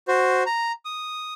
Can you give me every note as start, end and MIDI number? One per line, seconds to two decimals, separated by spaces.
0.08 0.43 66
0.08 0.43 72
0.46 0.72 82
0.85 1.34 87